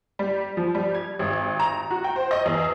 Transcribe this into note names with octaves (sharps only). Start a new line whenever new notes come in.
G3
F3
G3
G#6
G#1
A#5
F#4
G5
C5
D#5
E2